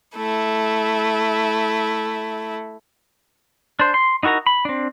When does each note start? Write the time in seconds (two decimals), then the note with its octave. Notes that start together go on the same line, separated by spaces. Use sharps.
0.16 A3 E4
3.80 D4 C5
3.94 C6
4.23 D#4 E4 F#4 A#4 A#5
4.47 B5
4.65 C4 D4